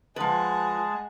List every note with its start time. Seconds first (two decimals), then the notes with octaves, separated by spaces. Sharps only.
0.16 F3 G#3 G#4 B4 F#5 A5